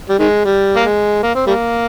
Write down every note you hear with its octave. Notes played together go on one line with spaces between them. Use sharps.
G3
D#3 G#3
G3
A#3
G#3
A#3
C4
G3 A#3